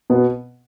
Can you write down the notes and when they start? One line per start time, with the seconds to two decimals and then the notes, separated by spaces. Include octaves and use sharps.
0.10 B2 B3